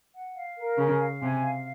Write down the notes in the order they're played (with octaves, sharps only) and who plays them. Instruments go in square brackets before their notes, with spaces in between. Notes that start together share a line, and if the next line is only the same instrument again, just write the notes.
[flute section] F#5
F5
A#4
[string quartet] C#3 [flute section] G#5
[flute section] F5
[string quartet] C3 [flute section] G#5
[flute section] F5